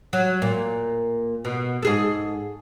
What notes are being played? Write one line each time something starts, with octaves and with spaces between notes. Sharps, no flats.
F#3
A#2
B2
G#2 G#4 A4